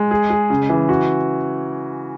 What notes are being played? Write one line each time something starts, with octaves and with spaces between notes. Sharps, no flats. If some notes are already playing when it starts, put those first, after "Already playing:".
Already playing: G#3
G#4
G#4
C#3
E3
F#4